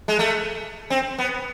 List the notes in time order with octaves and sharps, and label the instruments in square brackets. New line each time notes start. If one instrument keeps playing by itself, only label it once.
[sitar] G#3
A3
C4
B3